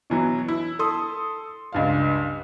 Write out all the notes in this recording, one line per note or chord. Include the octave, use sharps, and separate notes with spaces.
B2 E3 F#3
E4
A4 C6 D#6
C#2 G2 F5